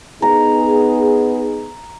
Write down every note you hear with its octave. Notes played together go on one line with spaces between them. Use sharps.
B3 D#4 G#4 A#5